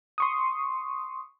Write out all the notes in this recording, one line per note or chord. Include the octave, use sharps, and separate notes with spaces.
C6 C#6 D#6